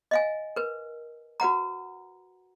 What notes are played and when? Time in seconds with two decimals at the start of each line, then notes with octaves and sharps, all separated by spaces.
0.11 D#5 F5 G#5
0.56 A#4 B4
1.40 F#4 B4 F#5 A#5